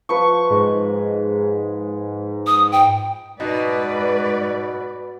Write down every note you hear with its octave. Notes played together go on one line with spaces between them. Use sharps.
F3 B4 C#6
G#2
D#6
G5
G#2 B2 D#4 B4 D5